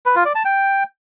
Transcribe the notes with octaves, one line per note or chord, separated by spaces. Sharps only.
B4
F4
D5
A5
G5